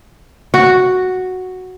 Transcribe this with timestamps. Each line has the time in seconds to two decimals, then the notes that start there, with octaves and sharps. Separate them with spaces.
0.54 F#4